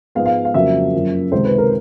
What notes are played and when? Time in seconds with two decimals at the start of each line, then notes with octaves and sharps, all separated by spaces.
0.15 G#2 F3 G#3 B3 F5
0.26 F5
0.45 F5
0.54 F2 C#3 F#3 A#3 E5
0.93 F#2 C#3 F3 A#3
1.32 C#2 C3 D#3 G#3 C5
1.45 B4
1.58 A#4